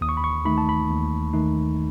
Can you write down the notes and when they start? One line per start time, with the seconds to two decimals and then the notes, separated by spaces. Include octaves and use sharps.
0.01 D#2 D#6
0.09 C#6
0.17 B5
0.24 C#6
0.45 D#3 A3 D#4 B5
0.58 A5
0.69 B5
0.89 D#2
1.33 D#3 A3 D#4